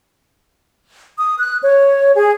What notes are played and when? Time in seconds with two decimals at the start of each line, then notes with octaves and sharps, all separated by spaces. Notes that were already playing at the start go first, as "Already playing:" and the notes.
1.18 D#6
1.38 F#6
1.63 C#5
2.15 G#4